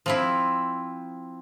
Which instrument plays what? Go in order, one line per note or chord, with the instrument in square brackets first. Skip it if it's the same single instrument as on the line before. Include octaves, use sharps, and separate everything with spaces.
[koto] F3 C4 E4